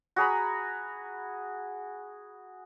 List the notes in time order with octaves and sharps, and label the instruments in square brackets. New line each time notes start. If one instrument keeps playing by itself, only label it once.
[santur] F#4 G#4 A#5 B5